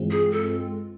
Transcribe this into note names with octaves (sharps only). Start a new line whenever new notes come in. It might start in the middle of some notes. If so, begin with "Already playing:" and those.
Already playing: G2 E3 G#3 C4 F4
G#4
A4